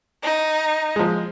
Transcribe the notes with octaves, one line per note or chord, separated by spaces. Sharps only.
D#4
F3 G#3